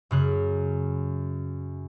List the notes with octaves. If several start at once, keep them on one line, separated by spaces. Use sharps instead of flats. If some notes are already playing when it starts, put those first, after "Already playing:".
F#2 C#3 F#6